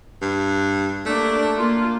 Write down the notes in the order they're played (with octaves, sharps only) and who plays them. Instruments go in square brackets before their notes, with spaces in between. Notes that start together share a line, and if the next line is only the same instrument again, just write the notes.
[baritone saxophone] G2
[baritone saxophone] A3 [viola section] A#3 D4
[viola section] A#3 F4